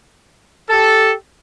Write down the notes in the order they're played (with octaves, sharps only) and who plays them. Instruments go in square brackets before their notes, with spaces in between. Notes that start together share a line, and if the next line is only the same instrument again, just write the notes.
[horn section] G4 A4